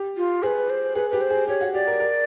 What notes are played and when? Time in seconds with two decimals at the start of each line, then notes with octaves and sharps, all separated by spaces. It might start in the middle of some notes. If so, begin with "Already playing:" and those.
Already playing: G4
0.17 F4
0.43 G#4 B4 C5
0.70 C5
0.95 G#4 B4
1.10 G4 B4
1.21 C5
1.30 G#4
1.48 G4 C#5
1.61 F#4
1.74 G4 D5
1.87 A#4
2.00 A#4